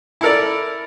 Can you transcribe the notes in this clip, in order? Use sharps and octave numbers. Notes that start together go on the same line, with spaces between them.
E4 A4 A#4 D5